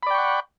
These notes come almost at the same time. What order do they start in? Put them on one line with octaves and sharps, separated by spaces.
B5 D5 G5 C#6 F#5